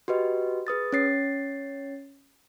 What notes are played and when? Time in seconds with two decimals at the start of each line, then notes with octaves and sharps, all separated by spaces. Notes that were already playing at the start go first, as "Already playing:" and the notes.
0.08 F#4 G4 B4 D#5
0.67 G#4 B4 D#6 A6
0.93 C#4 C#5 A6 C7